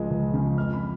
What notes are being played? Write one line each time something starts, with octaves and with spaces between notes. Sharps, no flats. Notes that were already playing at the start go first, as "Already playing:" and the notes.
Already playing: C#2 C#3 F3 G#3
C#2
C#3 F3 G#3
F2 F6
B5